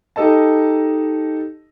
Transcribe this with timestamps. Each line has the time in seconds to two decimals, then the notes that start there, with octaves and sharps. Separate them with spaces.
0.16 D#4 G4 A4 D#5 A5